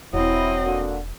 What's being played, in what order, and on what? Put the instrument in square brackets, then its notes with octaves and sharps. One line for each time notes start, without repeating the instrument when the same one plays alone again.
[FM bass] E1 [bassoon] F#3 [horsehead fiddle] C4 D#5 [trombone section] E4
[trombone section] D3 A#3 F#4